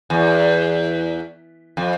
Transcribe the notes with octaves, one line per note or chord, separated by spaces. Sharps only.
E2
F2